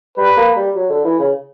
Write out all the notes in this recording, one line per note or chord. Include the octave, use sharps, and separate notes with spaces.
G3 B4
A#3
G3
F#3
D3
E3
C#3